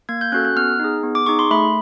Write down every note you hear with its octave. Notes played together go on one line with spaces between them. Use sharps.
A#3 G#6
G6
C#4 F#4 A4 F#6
F#6
B3 F6
D#4 G#4
B3
D6
D#4 G#4 C#6
C6
A3 B5